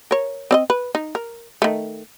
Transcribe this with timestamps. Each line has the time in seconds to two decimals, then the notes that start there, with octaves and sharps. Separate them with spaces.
0.11 A#4 C#5
0.51 C4 D5 D#5
0.70 B4
0.95 D#4
1.15 A#4
1.62 D#3 A3